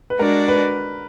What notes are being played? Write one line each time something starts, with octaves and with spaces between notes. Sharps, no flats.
B4
G#3 D4 F#4 A#4 D5
B4